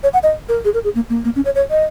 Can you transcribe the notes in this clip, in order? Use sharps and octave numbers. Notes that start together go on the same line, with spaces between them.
C#5
F#5
D#5
A#4
G#4
A#4
G#4
A#3
A#3
A#3
C#4
C#5
C#5
D#5